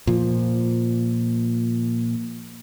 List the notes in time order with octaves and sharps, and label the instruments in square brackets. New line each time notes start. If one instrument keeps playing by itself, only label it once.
[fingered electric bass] A#2 F3